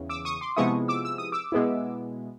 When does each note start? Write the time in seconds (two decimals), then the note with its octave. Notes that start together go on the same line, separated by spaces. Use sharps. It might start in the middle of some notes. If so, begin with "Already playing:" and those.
Already playing: E2 C#3 E3
0.09 D6 E6
0.25 C#6 D#6
0.41 C6 D6
0.56 C3 F3 G#3 B3 E4 C#6 D#6
0.88 D6 E6
1.05 E6
1.18 D#6
1.32 D6 E6
1.52 B2 G#3 B3 E4